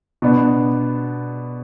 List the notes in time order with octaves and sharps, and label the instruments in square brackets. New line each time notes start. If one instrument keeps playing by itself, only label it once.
[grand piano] B2 B3 D4